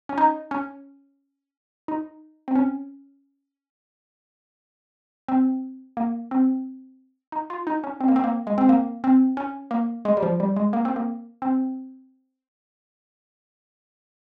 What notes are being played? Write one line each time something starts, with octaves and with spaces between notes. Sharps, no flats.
C#4
D#4
C#4
D#4
C4
C#4
C4
A#3
C4
D#4
F4
D#4
C#4
C4
A#3
C4
A#3
G#3
C4
A#3
C4
C#4
A#3
G#3
G3
F3
G3
G#3
A#3
C4
A#3
C4